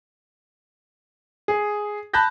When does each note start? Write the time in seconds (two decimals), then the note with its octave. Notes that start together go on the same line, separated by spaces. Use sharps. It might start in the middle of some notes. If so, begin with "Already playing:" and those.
1.48 G#4
2.13 A5 B5 F#6 G6 A#6